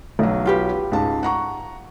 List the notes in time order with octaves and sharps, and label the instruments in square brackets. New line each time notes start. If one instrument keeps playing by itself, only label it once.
[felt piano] B1 F#3
[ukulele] F4 G4 B4
[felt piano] C#2 G#2 A5
F#5 A#5 C#6